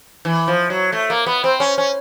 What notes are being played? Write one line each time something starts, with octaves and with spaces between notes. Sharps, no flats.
E3
F3
F#3
A3
A#3
B3
C4
C#4
C#4